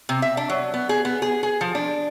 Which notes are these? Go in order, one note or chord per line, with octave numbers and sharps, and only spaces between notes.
C3
E5
D4
F#3
B3
G#4
B3
G#4
G#4
F3
D4